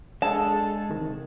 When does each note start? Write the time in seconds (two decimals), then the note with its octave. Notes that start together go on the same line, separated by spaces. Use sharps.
0.22 G#3 D4 G#4 A4 A5
0.90 C3 D#3